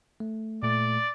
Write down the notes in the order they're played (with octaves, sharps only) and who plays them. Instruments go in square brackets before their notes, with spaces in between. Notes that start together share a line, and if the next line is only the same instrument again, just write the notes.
[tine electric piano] A3
[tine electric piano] A#2 A3 [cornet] D5